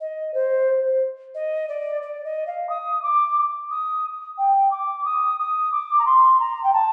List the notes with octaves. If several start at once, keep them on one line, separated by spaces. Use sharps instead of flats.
D#5
C5
D#5
D5
D5
D#5
F5
D#6
D6
D#6
G5
D6
D#6
D#6
D6
A#5
C6
A#5
G5
A5